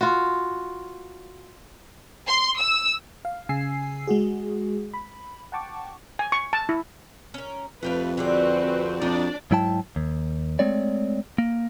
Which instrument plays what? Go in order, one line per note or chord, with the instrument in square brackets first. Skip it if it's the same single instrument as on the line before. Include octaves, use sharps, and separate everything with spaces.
[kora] F4 F#4
[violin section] C6
E6
[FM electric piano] F5
C#3 G#5 E6 C7
G#3 F#4 G#4
B5
F#5 G5 A5 C#6 D6
[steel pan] G#5
C#6
A5
E4
[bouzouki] C#4 A#4
[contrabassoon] F2 [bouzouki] A3 G4 F5 [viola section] B4
[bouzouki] D3 G#4 D5 [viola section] C4 F#4 B4
[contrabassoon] F2 [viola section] D4 D5 [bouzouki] D#4
[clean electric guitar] G#2 F#3 E4 G5 A5
D#2
G#3 A3 C4 C#5 D5
A#3